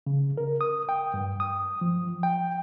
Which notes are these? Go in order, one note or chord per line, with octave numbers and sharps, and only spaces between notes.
C#3
A#4
D#6
G5
G2
D#6
F3
G5